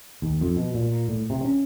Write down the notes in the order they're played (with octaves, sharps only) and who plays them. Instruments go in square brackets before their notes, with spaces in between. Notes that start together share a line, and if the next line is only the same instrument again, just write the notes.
[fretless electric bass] D#2
F2
B2
A#2
A2
C3
C#4